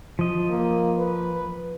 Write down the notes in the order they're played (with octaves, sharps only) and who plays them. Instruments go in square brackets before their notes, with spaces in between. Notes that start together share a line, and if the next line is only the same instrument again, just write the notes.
[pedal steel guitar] F3 D#5
[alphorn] A#3
B4